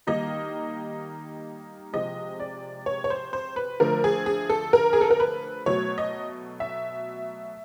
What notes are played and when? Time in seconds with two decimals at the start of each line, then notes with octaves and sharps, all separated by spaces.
0.07 D#3 G3 A#3 D#4 D#5
1.93 C3 F3 G#3 D#5
2.40 D5
2.86 C#5
3.04 C#5
3.10 C5
3.33 C5
3.56 B4
3.80 D3 F3 A3 A#4
4.04 G#4
4.26 G#4
4.49 A4
4.73 A#4
4.93 G#4
5.01 A4
5.11 A#4
5.20 B4
5.66 B2 F#3 A3 C#5
5.98 D#5
6.60 E5